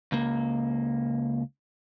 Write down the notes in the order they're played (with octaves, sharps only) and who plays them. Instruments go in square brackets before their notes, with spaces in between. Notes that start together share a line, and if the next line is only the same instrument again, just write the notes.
[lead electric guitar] C#2 A#3